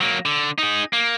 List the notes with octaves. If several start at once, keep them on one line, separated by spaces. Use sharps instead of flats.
F#3 A#3
D3
D#4 G#4
A#3